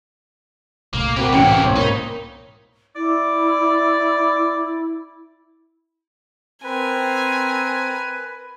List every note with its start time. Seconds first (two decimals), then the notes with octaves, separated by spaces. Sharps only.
0.94 C2 A#2 A3 A#3
1.17 C4 F#4 G4 A#4 B4
1.33 A1 A#3 C#4 E4 F#5 G5 C#7
1.64 C2 G#2 B2 C5 C#5
1.76 A#3 D#4 C#5 B5
2.96 E4 D5
6.64 C4 A#4 B4 G#5